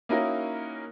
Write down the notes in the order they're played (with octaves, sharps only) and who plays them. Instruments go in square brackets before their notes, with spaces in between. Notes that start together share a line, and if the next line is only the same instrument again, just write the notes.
[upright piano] A#3 C#4 D#4 E4 F#4 A#4